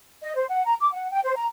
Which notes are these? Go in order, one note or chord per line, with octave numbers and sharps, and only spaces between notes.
D#5
C5
F#5
A#5
D6
F#5
G5
C5
A#5